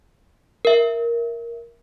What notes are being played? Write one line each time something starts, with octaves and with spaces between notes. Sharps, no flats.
A#4 E5